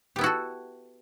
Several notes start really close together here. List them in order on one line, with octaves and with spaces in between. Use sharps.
G4 B3 E4 F#4 A4